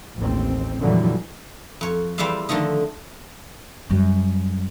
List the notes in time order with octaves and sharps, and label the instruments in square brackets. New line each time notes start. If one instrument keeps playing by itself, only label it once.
[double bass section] A1 D#2 C4
F2 A#2 D3 E3 F#3 G3
[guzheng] F2 C#5
E2 G3 C5 D5 E5 F5
D3 D#3 F3 A3 D#4
[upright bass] F#2 G3